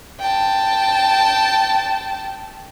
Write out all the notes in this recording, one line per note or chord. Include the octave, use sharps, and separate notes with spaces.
G5 A5